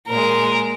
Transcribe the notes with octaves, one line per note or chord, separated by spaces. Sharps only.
A#2 G#3 A#4